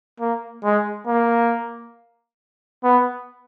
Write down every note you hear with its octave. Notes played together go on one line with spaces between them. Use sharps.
A#3
G#3
A#3
B3